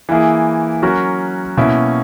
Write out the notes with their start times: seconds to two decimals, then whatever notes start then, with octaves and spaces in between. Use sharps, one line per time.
0.09 E3 A#3 E4 G#4
0.82 F#3 C#4 F#4 A#4
1.57 B2 A#3 C#4 E4